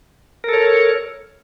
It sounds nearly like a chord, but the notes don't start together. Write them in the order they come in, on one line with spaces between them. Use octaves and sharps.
A#4 A4 C#5